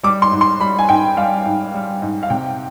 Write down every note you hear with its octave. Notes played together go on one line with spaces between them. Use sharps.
G3 D6
C6
G#2
C6
G3 B5
G#5
G#2 G5
G3 F5
G#2
G3
G#2
F5
C3 G5